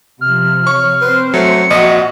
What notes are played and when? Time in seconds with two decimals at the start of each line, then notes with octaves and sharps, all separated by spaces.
0.21 C3 F3 F6
0.67 C#5 C#6
1.01 C4 B4 C5
1.34 F#3 A3 C#7
1.70 A#1 F#4 D#5